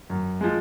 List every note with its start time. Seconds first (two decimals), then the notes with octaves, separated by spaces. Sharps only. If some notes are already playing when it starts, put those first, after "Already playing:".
0.10 F#2
0.41 F3 G#3